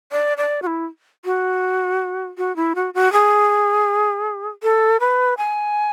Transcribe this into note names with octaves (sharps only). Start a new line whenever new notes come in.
D5
D5
F#4
E4
F#4
F#4
E4
F#4
F#4
G#4
A4
B4
G#5